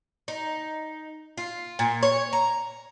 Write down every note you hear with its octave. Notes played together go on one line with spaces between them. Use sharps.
D#4
F4
A#2
C#5
A#5